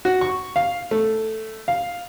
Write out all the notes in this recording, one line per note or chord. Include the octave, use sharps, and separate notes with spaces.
F#4
C#6
F5
A3
F5